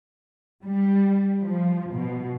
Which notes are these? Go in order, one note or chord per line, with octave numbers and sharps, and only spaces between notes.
G3
F3
B2